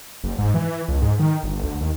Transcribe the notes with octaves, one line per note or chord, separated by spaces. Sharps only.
F#1
G#2
E3
C#2
G#2
D#3
G1
D2
D#2